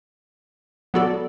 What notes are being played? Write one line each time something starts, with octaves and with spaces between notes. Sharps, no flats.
F#3 B3 F#4 A4 D5